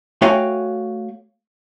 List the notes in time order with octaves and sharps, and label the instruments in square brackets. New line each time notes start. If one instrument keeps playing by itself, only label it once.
[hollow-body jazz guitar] A3 F#4 C#5 F5 G5 G#5